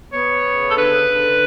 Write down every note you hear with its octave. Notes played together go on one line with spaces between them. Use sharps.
B3 C#5
C#3
A4
D3 B4
D3